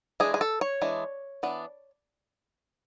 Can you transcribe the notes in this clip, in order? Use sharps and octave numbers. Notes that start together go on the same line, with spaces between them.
E3 G#3 D4 G#4
G#4
A4
C#5
E3 G#3 D4
E3 B3 D4